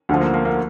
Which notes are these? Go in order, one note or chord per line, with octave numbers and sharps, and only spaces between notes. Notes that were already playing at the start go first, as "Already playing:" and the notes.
D2 D3 F3
A#3
A#3
A#3